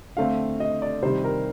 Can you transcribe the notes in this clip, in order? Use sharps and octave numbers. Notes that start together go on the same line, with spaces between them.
D3 A3 C4 F5
D#5
D5
C3 D#3 G3 C5
A#4